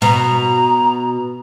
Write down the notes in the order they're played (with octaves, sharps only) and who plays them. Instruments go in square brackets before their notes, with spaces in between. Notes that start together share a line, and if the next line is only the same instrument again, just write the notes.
[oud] B2 [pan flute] A#5